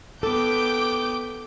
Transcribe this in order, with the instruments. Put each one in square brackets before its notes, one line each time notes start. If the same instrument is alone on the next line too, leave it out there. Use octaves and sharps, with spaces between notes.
[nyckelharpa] B3 G5 [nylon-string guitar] A4 [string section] D6 G6